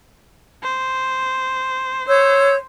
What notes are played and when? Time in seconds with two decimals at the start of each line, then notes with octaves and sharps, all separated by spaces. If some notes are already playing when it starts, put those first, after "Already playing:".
0.63 C5
2.08 C5 C#5 E6 G6